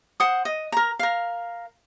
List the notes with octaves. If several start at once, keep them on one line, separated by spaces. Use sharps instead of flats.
C5 F#5 D#6
D#5
A#4 A#5
A#4 F5